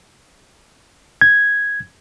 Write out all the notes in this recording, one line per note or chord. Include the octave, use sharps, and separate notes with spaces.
G#6